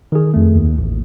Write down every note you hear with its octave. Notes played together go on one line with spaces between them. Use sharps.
D#3 G#4
F2 A3
D#2
A1